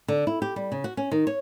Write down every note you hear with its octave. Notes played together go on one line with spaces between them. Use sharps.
D3
E4
G4
G3
C#3
F#4
C#4
D#3
C#5